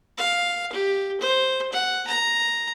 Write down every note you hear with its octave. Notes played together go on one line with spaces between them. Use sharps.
F5
G4
C5
F#5
A#5